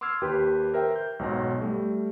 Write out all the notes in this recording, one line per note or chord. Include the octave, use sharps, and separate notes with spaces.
C6 D6 E6 F6 G#6 C7
D#2 G4 B4
A#4 C5 E5 G5
G6
B1 G#2 B2 F#3 C#5 A#6
G3 A3